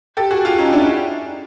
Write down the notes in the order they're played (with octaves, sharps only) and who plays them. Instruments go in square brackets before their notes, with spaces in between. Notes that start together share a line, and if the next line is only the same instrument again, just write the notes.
[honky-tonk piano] G4 A4
F#4 G#4
F4 G4
C#4 D#4
D4 E4